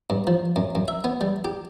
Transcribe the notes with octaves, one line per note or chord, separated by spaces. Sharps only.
G2
F3
F#2
F#2
E5
B3
G3
G4